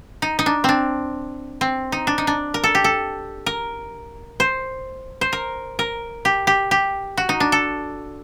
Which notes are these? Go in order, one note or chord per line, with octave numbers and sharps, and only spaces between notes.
D#4
D#4
D4
C4 D4
C4
D#4
D4
D#4
D4
A#4
A4
G4
A4
A#4
C5
C5
A#4
A#4
G4
G4
G4
F#4
D#4
D4
A4